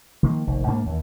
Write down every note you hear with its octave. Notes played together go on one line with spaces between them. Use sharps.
D#3 F3 A#3
F1 A#1 D#3
G#2 A#3 D4
D#2 E3